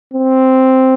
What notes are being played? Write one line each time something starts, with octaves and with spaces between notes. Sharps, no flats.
C4